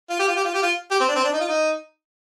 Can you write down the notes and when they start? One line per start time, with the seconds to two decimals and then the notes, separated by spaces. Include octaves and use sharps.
0.10 F4
0.19 G4
0.28 F4
0.36 G4
0.45 F4
0.54 G4
0.62 F4
0.91 G4
1.00 C4
1.08 D4
1.16 C4
1.24 D4
1.32 D#4
1.41 F4
1.48 D#4